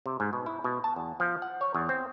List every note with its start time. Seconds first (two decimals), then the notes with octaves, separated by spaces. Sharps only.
0.06 C3
0.20 G#2
0.33 B2
0.46 E4
0.64 B2
0.84 A5
0.96 E2
1.20 F3
1.42 F#5
1.61 C#5
1.74 E2
1.89 C4